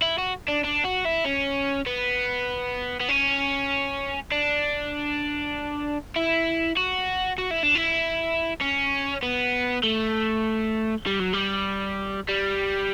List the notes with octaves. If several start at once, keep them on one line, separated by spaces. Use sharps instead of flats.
E4
F#4
D4
D4
F#4
E4
C#4
B3
B3
C#4
D4
E4
F#4
F#4
E4
D4
E4
C#4
B3
A3
G3
F#3
G3
G3